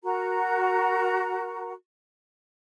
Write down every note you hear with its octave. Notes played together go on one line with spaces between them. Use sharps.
F#4 A#4 A#5